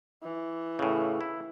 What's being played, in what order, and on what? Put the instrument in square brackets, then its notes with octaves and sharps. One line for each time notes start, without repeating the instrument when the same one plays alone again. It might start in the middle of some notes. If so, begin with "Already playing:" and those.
[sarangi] E3
[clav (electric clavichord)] A2 C#3
E4